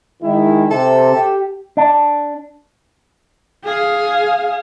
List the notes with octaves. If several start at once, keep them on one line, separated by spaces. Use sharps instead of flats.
D#3 G#3 E4
C3 A4
G4
D4
G#4 F5